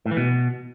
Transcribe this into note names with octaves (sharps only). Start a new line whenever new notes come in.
A2
E3
B2